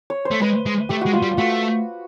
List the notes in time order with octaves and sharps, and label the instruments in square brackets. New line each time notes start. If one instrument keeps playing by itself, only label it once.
[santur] C#5
C5
[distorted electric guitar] A3
[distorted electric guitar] G#3 [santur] B4
[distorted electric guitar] G#3
[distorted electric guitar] A3 [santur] G4
[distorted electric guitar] G#3 [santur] F#4
[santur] F4
[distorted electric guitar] G3
[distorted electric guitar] A3 [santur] F#4